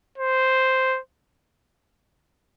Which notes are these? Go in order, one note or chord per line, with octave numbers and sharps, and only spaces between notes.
C5